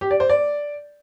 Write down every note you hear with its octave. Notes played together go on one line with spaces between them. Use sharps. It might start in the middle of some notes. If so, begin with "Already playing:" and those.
G4
D5
C5
D5